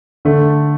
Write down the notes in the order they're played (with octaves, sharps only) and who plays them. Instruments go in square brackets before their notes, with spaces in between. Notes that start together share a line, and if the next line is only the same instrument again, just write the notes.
[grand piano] D3 A3